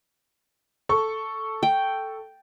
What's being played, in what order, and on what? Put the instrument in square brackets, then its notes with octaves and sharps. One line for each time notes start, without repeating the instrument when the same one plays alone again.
[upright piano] A4 C#6
[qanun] G5